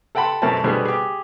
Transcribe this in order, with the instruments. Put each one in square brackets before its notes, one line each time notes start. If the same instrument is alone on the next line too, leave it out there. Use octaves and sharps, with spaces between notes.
[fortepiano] A4 F#5 G5 A5 B5 C6
F#2 B2 A3 A#4 C5 A5
B2 D3 G3 B3 G#4 C5
G4 G#4